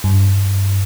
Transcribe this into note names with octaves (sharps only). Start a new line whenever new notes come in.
G2